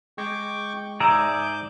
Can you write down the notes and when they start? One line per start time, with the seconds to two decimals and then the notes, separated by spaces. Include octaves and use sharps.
0.18 G#3 G5 C#6 D6
1.00 G#2 G#4 D5 E5 A#5 D6 G6